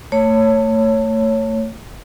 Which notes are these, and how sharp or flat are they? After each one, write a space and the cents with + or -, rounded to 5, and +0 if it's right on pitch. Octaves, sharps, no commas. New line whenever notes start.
A3 +30 C#5 +0